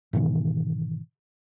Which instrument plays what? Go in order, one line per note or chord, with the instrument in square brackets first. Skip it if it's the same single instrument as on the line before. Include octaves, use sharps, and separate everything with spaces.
[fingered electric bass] G#2 B2 D#3 E3